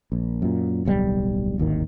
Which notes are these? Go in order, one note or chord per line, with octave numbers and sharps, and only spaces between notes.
A#1
F#2 A#2
D1 B1 A#2 G3
D1 G#1 D#2 D#3